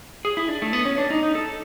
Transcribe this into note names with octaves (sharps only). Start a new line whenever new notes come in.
G#4
E4
D4
A3
B3
C#4
D4
D#4
D#4
A4